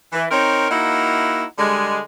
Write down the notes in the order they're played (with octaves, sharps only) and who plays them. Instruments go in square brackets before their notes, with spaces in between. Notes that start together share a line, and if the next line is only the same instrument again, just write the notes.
[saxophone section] E3
C4 D#4 A#4 C#5
A#3 D#4 E4 F#4 F#5
D3 G3 G#3